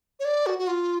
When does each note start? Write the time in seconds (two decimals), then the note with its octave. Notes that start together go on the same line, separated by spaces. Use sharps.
0.20 C#5
0.25 D5
0.46 F#4
0.59 F#4
0.67 F4